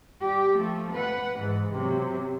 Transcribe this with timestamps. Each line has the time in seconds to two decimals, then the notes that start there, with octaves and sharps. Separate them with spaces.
0.21 G3 G4
0.55 F3 A3
0.92 B4 F#5
1.39 G#2 E3
1.73 C3 F#3